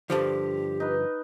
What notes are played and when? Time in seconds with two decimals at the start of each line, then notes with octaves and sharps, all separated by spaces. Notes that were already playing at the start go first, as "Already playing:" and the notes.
0.10 G2 D3 F3 G4
0.80 D#4 B4